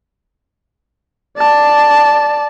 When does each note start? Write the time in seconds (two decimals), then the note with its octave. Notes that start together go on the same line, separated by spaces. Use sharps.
1.38 D5 A5